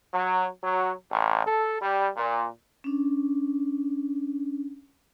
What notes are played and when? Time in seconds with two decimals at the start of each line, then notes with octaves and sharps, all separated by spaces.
0.13 F#3
0.63 F#3
1.10 A1
1.46 A4
1.81 G3
2.17 A#2
2.84 C#4 D4